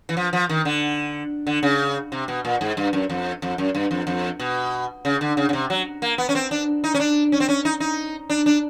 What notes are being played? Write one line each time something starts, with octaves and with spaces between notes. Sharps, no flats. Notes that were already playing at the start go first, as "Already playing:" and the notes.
E3
F3
F3
D#3
D3
D3
C#3
C3
B2
A#2
G#2
G2
F#2
F2
F2
F#2
G2
F2
F2
B2
C#3
D3
C#3
C#3
C3
F#3
A#3
B3
C#4
C4
D4
D#4
C#4
D4
C#4
C4
C#4
D#4
D#4
D4
D4